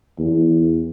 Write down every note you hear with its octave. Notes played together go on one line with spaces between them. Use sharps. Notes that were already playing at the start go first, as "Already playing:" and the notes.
E2